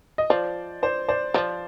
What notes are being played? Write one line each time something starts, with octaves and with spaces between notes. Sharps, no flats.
D#5
F3 C5 D5
C5 D5
C5 D5
F3 C5 D5